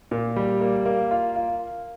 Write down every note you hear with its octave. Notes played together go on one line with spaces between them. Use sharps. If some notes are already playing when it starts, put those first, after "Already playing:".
A#2
G3
A#3
A#3
F4
F4